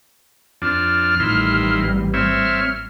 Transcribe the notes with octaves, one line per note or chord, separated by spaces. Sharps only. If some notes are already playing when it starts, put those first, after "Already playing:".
F2 D4 F6
A1 D#3 G3 E4 C6
C4 C#5 E5 F6